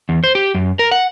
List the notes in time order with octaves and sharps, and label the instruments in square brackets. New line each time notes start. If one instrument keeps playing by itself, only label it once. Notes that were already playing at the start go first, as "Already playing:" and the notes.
[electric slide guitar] E2
C5
G4
F#2
A#4
F#5